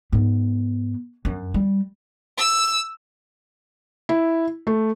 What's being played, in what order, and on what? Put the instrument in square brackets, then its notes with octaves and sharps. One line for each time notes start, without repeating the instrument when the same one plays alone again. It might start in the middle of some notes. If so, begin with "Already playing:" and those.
[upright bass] G#2 B3
F#2
G3
[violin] E6
[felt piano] E4
A3